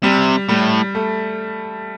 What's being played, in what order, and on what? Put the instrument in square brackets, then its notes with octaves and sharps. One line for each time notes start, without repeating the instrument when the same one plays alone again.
[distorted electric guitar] C3 [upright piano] G3
[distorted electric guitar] A2 [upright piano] G3
[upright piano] A3